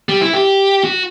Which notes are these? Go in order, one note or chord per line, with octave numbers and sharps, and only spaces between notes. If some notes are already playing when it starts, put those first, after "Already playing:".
G3
E4
G4
F#4